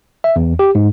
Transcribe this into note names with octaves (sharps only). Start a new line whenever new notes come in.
E5
E2
G4
G#2